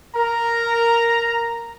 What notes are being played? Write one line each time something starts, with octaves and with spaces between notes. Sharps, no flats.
A#4 A#5